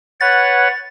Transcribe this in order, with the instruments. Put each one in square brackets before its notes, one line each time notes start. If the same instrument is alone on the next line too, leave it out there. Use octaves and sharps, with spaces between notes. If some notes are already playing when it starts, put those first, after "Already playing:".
[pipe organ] B4 C#5 F#5 [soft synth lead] A6